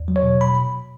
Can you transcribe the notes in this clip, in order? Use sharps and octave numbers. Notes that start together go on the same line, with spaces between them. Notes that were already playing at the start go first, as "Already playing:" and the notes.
Already playing: E2
F#3
C#5
B2
B5